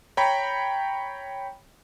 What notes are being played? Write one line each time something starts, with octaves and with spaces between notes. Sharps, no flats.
C#5 G5 A#5 B5